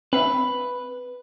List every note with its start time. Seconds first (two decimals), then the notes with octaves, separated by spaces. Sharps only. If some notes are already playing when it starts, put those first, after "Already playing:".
0.13 C4 B4 E5 F5